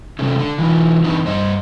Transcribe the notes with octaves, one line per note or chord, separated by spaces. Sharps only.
C3 G#3 A3 C#4
D3
E3 D#4 F4
D3 E3 C4 D4 D#4 B4
G2 C5 D#5